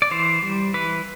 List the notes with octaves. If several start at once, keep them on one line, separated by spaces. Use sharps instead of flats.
D5
E3 C5
G3
E3 B4